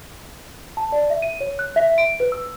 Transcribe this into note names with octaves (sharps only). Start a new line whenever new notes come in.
A5
D5
E5
D#7
C#5
F#6
E5
D7
B4
E6